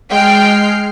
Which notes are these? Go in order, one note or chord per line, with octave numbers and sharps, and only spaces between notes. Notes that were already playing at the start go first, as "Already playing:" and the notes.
G#3 G5 F6 C7